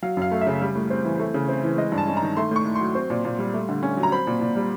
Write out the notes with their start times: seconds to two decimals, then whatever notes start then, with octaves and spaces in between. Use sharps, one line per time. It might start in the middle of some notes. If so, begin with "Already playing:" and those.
0.02 F#3 F5
0.17 F#2 F5
0.32 A3
0.41 E5
0.47 C#3
0.62 G3
0.75 A2
0.90 C4
1.04 E3
1.20 A3
1.34 C#3
1.49 C4
1.64 E3
1.78 G#3 D#5
1.92 G2
1.98 A5
2.07 C#4
2.17 A#5
2.22 D#3
2.37 A3 C6
2.51 A2 C#6
2.65 A2
2.76 C6
2.81 F#3
2.95 C4
3.10 A#2
3.25 A#2
3.39 G3
3.54 A3
3.69 D3
3.83 C#4
3.97 F#3
4.03 A#5
4.12 C4 B5
4.27 A#2
4.41 A#2
4.56 G3